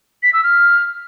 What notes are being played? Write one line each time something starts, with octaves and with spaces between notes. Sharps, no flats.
B6
E6
F6